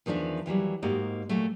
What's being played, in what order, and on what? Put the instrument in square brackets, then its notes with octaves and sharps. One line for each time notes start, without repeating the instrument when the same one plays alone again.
[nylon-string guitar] E2 D#3 F3 D4 E5
D#2 E3 F#3 G3
G#2 A#3 F#4 G4 D#5
A#2 F#3 A3